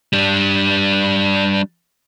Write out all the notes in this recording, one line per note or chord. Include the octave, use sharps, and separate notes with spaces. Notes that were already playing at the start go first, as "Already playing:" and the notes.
G3 D4